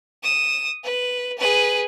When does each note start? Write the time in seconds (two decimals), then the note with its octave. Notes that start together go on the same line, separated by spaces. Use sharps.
0.23 D#6 E7
0.84 B4
1.38 G#4 B4